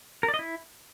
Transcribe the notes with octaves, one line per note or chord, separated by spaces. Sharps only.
A#4
D5
D#5
E4